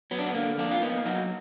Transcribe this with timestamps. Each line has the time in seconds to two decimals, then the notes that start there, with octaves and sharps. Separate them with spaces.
0.11 F#3 B3
0.19 D4
0.27 B3
0.34 D3 A#3
0.58 F2 A#3 D4
0.71 F4
0.82 A#3 B3 D#4
1.05 F#3 D#4 F#4